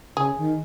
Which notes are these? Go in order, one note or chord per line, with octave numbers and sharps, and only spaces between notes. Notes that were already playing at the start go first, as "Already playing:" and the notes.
C#3 G#4
D#3